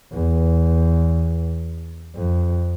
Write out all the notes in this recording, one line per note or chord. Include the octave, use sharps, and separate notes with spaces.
E2
F2